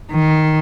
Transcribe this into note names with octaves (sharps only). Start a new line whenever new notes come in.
D#3